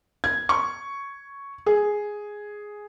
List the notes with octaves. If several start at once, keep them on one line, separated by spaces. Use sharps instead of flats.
G#6
C#6
G#4